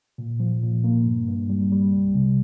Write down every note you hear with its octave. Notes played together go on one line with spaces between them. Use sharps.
A#2
F3
A#2
A#3
G2
G2
G3
G3
C2
C3